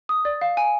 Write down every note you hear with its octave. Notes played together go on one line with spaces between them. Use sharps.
D#6
D5
F5
G#5